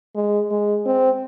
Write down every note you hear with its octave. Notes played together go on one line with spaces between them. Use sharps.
G#3
G#3
C4